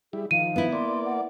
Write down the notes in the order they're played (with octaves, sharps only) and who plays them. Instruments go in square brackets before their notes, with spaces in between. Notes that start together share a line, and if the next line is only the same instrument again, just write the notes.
[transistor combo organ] G3 E4 [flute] G#4
[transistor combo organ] D#3 F3 [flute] F5 [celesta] D#7
[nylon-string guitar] B3 E4
[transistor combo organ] A#3 D5 [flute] C6
[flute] F#5